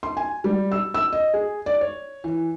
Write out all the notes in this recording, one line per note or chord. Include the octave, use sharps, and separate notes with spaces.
C6
G#5
G3
E6
E6
D#5
G#4
D5
C#5
E3